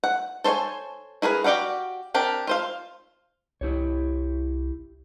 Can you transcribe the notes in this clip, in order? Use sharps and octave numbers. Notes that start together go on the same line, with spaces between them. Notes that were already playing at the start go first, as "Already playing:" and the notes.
F#5
A4 C5 C#5 G5 G#5
E4 G#4 A#4 B4
F#4 G4 D5 F5 F#5
C4 D4 G4 A#4
F4 C5 F5
C2 E4 G4 C#5